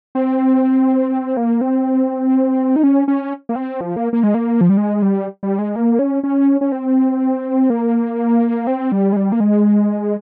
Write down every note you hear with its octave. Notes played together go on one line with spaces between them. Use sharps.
C4
A#3
C4
D#4
C#4
C#4
A#3
C4
F3
A#3
A#3
G#3
A#3
F3
G3
G#3
G3
G3
G#3
A#3
C#4
C#4
C#4
C4
A#3
C4
G3
G#3
G3
A#3
G#3